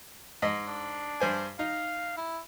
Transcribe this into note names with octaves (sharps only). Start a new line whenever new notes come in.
G#2 D#5
D4
G2 C5 G#5
D#4 F5
E4